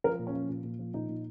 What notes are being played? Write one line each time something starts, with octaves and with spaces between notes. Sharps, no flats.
F3 A#4
A#2
C#4
F3
A#2
A#2
F3
A#2 D#4
A#2